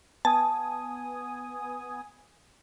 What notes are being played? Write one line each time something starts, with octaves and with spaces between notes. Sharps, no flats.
B3 G#5 A5 D#6